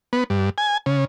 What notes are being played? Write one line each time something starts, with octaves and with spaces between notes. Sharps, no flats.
B3
G2
G#5
C#3